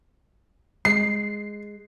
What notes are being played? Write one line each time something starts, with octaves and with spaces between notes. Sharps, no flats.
G#3 C7